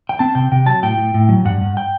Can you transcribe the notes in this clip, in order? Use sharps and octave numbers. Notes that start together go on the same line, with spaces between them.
G5
C4 A5
C3 G5
C3 G5
F#3 A5
A2 G5
A2
A2
F#3
G2 F#5
G2
G5